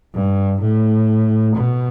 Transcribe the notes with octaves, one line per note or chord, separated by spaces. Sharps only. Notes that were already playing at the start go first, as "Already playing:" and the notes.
G2
A2
B2